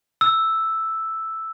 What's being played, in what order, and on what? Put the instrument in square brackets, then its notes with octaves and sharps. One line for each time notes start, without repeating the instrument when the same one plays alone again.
[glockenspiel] E6